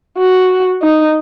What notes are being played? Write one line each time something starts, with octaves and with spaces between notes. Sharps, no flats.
F#4
D#4